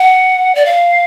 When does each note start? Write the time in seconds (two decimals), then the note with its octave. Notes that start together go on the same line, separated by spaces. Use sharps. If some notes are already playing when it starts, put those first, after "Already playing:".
Already playing: F#5
0.55 D5
0.66 F5